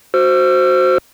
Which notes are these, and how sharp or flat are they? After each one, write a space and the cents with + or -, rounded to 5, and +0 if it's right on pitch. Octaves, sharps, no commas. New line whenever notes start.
F#4 +0 C5 +0 E6 +45